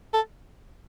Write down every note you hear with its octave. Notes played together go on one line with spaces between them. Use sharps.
A4